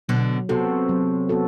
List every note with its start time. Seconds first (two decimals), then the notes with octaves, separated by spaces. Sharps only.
0.09 B2 D3 F#3
0.49 C3 B3 F#4 A4
0.89 F#3
1.29 B3 F#4 A4